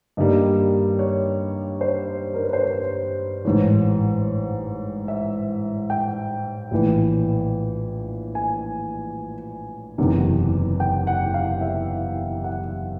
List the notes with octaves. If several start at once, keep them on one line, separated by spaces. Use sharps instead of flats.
G2 D#3 G3 A#3 D#5
C#5
C5
A#4
B4
C5
C#5
A1 G#2 E3 C#5
E5
G5
A#1 A2 E3
G#5
F#1 E2 C3 D#3
G5
F#5
F5
E5
F#5